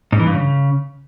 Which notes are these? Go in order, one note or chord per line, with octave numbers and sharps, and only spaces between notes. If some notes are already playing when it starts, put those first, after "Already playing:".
G#2
E3
G2
C#3